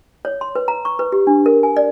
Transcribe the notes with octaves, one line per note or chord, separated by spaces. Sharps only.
C#5
C6
B4
A#5
C#6
B4
G4
D4
A#4
G#5
D5